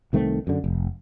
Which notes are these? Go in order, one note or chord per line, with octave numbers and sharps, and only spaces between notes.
C2 D#3 A3 C4
F#2 D3
F1